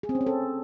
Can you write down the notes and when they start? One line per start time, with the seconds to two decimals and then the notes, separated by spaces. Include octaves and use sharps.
0.03 G#4
0.09 C4
0.15 C#4
0.21 C4
0.26 A4